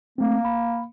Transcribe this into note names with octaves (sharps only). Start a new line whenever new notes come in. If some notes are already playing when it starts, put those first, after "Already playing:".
A3 A#3 C4
B5